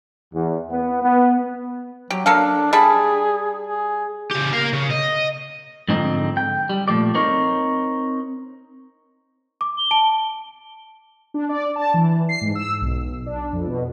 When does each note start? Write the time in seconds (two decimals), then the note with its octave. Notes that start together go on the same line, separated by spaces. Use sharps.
0.33 E2
0.71 B3
1.03 B3
2.10 F#3 G4
2.26 A#3 D4 A4 F5
2.73 G3 G#4 A5 B5
3.67 G#4
4.31 C#3 G4
4.53 A#4 F5
4.73 C#3
4.91 D#5
5.89 G#2 D3 F3 C4 D#4
6.37 G5
6.69 G3
6.88 A#2 F3 A3 D5
7.15 C4 D#4 A#4 C#5
9.61 D6
9.78 G7
9.91 A5 D7
11.34 D4
11.49 D5
11.76 A5
11.94 E3
12.29 C7
12.41 G#2
12.55 E6
12.82 B1
13.26 D4
13.53 F2
13.67 B2